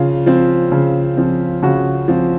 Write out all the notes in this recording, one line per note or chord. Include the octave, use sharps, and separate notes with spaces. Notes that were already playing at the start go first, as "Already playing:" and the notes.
Already playing: C#3 F3 F4
F3 C4
C#3
F3 C4
C#3 F#4
F3 C4